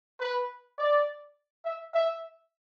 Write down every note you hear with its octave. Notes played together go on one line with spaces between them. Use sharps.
B4
D5
E5
E5